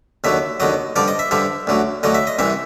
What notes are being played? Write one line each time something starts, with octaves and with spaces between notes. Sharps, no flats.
D#2 D3 F#3 E5
D#2 D3 F#3 D#5
G2 D3 F3 D5
D#5
E5
G2 D3 F3 E5
D2 D3 F#3
D2 D3 F#3 D#5
E5
D#5
C2 C3 E3 E5